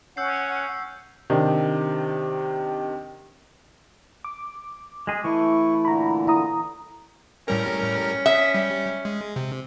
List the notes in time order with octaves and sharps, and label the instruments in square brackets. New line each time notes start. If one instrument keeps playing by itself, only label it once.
[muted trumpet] C#4 [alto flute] F#5 [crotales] E6 G6 C7
[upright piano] C3 D#3 D4
[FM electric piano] D6
[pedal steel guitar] G#3 G#4
[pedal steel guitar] E3 A3 [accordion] E4 C#6
[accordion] A#2 D3 [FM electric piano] A#5 B5
[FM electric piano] E4 A#5 D#6
[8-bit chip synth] A2 G3 A#4 [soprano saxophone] C#4
[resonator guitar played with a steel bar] E5 [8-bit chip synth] D#6
[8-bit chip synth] G3
G#3
C3